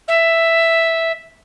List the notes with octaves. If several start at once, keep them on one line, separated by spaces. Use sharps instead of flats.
E5